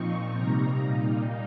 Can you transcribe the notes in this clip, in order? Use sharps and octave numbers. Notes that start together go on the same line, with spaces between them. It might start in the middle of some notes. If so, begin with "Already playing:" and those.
Already playing: A#2 F3 C4 D#4 C#6
C3 G3 A#3 D#4 A#5
A#2 G3 A#3 D#4